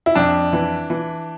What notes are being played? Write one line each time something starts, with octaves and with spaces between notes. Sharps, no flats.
E4
F2 D4
E3
E3